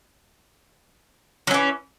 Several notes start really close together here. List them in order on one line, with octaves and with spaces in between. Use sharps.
F#3 C#4 E3